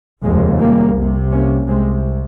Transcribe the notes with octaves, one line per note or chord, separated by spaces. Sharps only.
F1 D#2 C#3 F3 G#3
G3 A#3
C2 C3
A#3 C#4
C2 C3 G#3 C4